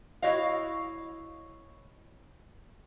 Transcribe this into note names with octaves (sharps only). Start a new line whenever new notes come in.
E4 F#4 C#5 D#5 F5